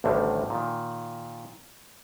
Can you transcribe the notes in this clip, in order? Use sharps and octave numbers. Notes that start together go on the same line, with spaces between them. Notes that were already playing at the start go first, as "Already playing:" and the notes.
A1 D2 A2 D3 D#3 G3
A#2 D#3